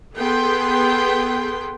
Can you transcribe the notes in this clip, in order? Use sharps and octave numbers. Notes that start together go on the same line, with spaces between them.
B3 G#4 A4 B4 G5 C6